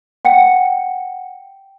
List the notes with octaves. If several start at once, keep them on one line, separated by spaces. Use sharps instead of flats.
F#5 G5 C#7